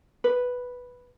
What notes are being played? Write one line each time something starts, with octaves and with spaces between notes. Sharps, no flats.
B4